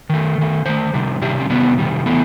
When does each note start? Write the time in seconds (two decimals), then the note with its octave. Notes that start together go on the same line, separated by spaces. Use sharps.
0.10 D#3 A3
0.38 D#3 A3
0.66 D#3 A3 C5
0.94 C3 D#3 G3
1.21 C3 D#3 G3 G4
1.40 C4
1.50 C3 D#3 G3 B3
1.78 C3 D#3 G3
2.06 E3 A3 B3